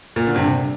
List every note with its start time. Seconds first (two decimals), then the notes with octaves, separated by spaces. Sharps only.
0.16 A#2
0.26 D3
0.35 G2 C3